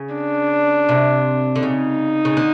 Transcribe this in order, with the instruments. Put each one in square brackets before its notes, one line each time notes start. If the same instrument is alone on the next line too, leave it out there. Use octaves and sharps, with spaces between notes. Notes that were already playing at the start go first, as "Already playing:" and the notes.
Already playing: [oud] C#3
[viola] D4
[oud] C3
D3
[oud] C#3 [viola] D#4
[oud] C#3
D3